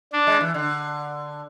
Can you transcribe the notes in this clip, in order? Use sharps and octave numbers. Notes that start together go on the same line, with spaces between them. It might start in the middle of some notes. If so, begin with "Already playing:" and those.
D4
G#3
E3
D3